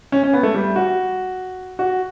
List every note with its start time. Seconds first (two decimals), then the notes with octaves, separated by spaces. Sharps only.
0.12 C#4
0.23 C#4
0.33 B3
0.43 A3
0.54 G3
0.76 F#4
1.79 F#4